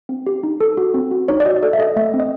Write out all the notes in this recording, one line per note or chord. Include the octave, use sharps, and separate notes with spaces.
C4
G4
D#4
A4
F#4
C4
F#4
D#4 C#5
D5
F#4 D#5
A4 D5
E5
A4 D#5
A3 E5
C4
D#5